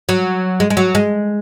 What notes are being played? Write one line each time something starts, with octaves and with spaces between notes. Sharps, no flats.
F#3
G#3
G#3
F#3
G#3